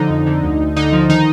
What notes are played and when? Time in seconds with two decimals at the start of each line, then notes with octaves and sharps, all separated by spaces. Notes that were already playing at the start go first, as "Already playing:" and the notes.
Already playing: D3 F3 D#4
0.10 F2
0.27 D3
0.43 D2
0.60 D2
0.77 D3 D#4
0.93 F3
1.09 D#3 D#4